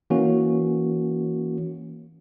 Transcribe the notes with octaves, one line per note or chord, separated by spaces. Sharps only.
E3 A#3 C#4 F#4